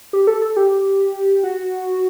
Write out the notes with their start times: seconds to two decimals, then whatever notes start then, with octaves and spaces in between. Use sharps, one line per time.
0.13 G4
0.27 A4
0.42 A4
0.57 G4
1.44 F#4